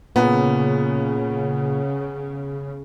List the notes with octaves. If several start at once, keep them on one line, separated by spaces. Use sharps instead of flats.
A#2 C#3 B3